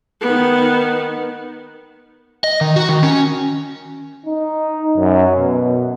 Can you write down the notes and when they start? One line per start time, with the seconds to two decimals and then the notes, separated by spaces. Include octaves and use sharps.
0.21 D#3 B3
2.44 D#5
2.61 D#3
2.76 F#4
2.89 D#3
3.03 C#4
4.26 D#4
4.97 F#2
5.38 B2